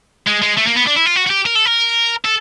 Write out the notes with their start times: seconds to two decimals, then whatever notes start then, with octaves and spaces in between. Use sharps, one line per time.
0.27 G#3
0.42 G#3
0.57 A3
0.66 A#3
0.76 B3
0.86 D4
0.96 E4
1.06 F4
1.16 F#4
1.26 F#4
1.30 G4
1.46 A#4
1.55 A4
1.66 A#4
2.25 A4